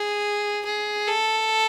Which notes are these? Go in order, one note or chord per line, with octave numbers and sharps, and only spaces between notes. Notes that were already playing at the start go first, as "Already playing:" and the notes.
Already playing: G#4
G#4
A4